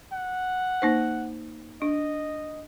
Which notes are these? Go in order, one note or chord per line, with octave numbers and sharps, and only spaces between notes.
F#5
A#3 D#4 C5
D4 D#5